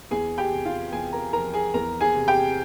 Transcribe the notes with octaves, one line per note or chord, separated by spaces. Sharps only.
E2 G#4 G#5
G4 G5
C3
F4 F5
E2 G#4 G#5
A#4 A#5
F3 A#4 A#5
G#4 G#5
E2 A#4 A#5
G#4 G#5
C3
G4 G5